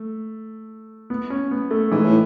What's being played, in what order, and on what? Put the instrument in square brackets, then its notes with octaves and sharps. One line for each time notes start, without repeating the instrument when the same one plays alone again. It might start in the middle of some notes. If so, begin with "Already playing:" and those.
Already playing: [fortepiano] A3
B3
C#4
B3
A3
[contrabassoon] G#2 [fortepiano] E3
[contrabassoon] A2